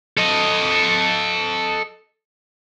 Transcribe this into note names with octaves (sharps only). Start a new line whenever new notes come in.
A4 D#5